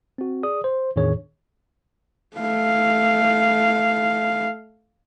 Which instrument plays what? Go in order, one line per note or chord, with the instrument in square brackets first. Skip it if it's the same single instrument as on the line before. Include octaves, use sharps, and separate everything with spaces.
[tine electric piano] C4 F#4
G#4 D5 D#6
C5
E2 A2 D#3 D4 G#4 C#5
[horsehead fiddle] A3 F5